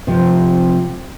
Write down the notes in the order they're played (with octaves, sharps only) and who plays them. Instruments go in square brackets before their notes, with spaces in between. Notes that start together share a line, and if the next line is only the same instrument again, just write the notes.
[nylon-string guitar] C3 F3